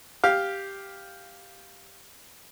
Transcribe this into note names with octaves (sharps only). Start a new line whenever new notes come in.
G4 F5